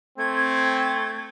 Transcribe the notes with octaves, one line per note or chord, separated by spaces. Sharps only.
A3 C4 G#6